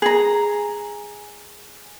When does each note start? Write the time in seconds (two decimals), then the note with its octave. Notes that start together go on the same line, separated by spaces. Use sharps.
0.02 G#4 A#5